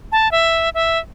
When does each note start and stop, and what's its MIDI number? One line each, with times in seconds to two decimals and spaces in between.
0.12 0.31 81
0.32 0.69 76
0.74 0.99 76